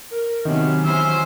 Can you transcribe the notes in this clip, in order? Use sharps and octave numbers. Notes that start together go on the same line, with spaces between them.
A#4
C3 D#3 F#3 B3 C#4
E3 F#3 C#4 C5 E6